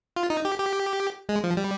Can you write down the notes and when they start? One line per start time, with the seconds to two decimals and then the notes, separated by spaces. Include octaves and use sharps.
0.16 F4
0.30 D#4
0.45 G4
0.59 G4
1.29 G#3
1.44 F3
1.57 G3